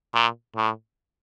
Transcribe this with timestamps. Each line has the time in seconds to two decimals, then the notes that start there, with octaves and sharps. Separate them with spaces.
0.13 A#2
0.56 A2